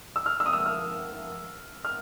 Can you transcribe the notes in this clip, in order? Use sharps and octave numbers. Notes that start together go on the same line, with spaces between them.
E6
F6
E6
D#6
E6
F6
F6